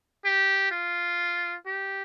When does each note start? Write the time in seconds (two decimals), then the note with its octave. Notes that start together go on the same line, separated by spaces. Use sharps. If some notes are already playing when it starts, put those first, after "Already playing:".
0.25 G4
0.71 F4
1.66 G4